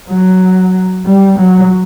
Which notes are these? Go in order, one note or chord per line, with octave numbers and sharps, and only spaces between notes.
F#3
G3
F#3